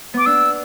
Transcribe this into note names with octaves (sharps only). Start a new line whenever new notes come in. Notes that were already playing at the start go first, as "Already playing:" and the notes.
B3 D6
D4 E6